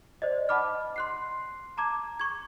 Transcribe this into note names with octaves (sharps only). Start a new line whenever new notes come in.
C5 D5 D#5
D#5 F#5 A5 B5 D6 F6
C6 F#6 C7
A5 A#5 D6 G#6
C#6 G#6